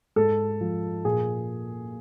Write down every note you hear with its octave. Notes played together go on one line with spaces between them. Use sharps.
G#2 A4
F3
A#2 G#4